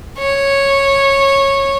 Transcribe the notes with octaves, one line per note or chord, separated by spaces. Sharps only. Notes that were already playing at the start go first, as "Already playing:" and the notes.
C#5